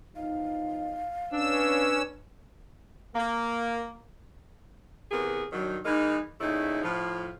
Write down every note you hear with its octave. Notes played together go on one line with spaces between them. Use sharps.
E2 F3 D#4 F5
C#4 D4 B4 E6
A#3
C3 E3 B3 G#4 A#4
G2 D#3 F#3
E3 G#3 A#3 D#4
A#2 C#3 A3 D#4 E4
A2 F3